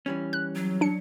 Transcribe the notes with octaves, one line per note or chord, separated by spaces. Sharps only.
E3 G3 C#4
F#6
F#3
D4 C#7